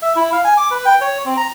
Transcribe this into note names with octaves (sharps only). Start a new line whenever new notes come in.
E5
E4
F5
G#5
D6
B4
G5
C#5
C4
A#5